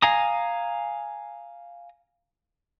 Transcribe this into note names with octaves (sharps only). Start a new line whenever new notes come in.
F5 G#5 A#5 D#6